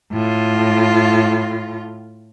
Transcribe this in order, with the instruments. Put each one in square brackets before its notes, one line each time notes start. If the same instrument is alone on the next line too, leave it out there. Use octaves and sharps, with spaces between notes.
[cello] A2 F4